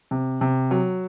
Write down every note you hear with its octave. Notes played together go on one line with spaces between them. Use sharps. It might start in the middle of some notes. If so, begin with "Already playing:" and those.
C3
C3
F#3